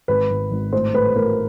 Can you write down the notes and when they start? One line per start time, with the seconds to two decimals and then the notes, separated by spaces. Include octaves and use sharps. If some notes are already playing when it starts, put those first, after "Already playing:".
0.08 G#1 B4
0.30 G#1
0.51 G#1
0.73 A2 C5
0.94 A2 B4
1.15 A2 A#4